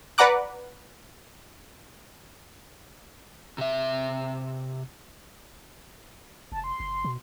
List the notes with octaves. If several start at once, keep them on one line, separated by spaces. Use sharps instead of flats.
B4 D5 F#5 A#5 D6 F#6
C3 E5
F1 A5
C6
F#1
B2